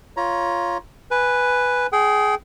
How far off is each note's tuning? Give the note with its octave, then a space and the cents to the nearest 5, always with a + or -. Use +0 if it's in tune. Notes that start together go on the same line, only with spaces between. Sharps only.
F4 +0 C#5 +0 A#5 +25
B4 +0 G#5 +0
G#4 +15 G5 -25